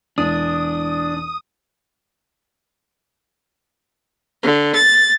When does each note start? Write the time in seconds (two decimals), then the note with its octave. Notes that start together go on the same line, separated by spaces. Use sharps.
0.18 E1 E2 G#3 D4 D#6
4.43 D3
4.75 A6